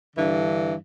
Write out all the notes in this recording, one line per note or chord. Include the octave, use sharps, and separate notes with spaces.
G2 D3 E3